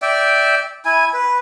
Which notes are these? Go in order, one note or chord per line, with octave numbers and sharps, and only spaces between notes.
D5 E5 G5
E4 G#5
B4